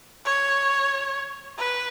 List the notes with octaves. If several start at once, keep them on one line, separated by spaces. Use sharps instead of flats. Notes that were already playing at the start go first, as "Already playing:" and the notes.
C#5
B4